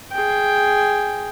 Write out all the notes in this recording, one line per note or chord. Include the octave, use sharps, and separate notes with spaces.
G#4 G5